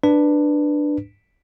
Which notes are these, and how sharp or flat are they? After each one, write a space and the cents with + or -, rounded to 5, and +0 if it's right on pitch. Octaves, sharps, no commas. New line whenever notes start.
D4 +10 B4 +0